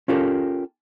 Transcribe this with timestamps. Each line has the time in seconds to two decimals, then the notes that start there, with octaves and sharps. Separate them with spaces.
0.08 C#4 F4 G4 A4 A#4